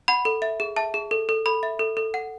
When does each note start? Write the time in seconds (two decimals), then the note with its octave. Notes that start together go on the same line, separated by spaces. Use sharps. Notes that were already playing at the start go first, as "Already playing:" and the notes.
0.08 F#5 B5
0.25 A4
0.42 E5
0.60 G#4
0.76 E5 A5
0.94 G#4
1.11 A4
1.29 A4
1.46 A4 B5
1.63 E5
1.79 A4
1.97 A4
2.14 F#5